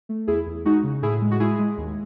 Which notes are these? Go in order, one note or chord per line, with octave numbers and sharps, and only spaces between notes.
A3
E2 E4 G#4
E2
G#3 D#4 F#4
C#3
A2 E4 G#4
G#3
F#4
G#3 E4 G#4
G#3
D#2